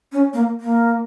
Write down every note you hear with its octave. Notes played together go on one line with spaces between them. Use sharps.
C#4
A#3
A#3